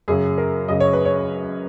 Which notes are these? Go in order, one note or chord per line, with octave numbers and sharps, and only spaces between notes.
F#2 C#3 G#4
A#4
F#2 C#3 D#5
C#5
B4
C#5